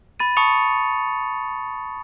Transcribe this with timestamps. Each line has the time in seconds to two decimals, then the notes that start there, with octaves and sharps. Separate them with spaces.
0.20 B5 A6 D#7
0.37 A5 B5 C#6 D#6 C#7 F7